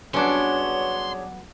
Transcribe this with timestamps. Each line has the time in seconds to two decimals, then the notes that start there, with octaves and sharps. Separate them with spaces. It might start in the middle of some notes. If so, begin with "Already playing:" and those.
0.14 F#3 G3 B3 C#4 D4 G#4 C#5 C6